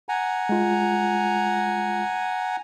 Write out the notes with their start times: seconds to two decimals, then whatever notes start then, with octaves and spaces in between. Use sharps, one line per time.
0.09 F#5 G#5 A#5
0.49 G#3 F4